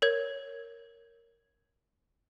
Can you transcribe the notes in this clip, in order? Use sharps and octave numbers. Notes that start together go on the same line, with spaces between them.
A#4 C#5 G#6